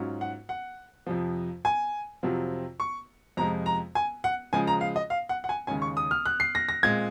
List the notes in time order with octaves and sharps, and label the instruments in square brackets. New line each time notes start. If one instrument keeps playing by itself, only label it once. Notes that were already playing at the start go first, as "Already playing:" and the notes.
Already playing: [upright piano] G#2 F#3 C#4 F4
F#5
F#5
F2 C3 F3
G#5
F2 C3 F#3 C4 F4
C#6
F2 C3 F3 G#3 A#5
A#5
G#5
F#5
C#3 F3 G#3 G#5
A#5
F5
D#5
F5
F#5
F#5
G#5
D#2 C#3 G#3 C#4 G#5
C#6
D#6
F6
F#6
C7
A#6
A#6
A#2 G#3 C4 F4 G#6